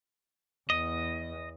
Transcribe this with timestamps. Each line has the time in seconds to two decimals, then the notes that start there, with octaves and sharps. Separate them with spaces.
0.70 E2 D#5